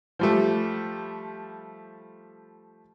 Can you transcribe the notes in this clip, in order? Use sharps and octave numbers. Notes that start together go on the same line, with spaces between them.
F3 G3 A3